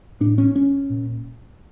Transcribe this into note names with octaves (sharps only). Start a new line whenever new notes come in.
A2 D4
C#4
C#4
A#2